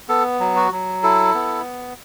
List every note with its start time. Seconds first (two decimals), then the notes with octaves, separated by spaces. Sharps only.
0.09 B3 A4
0.40 F#3
0.56 F#4
0.72 F#3
1.03 E4 A4
1.35 B3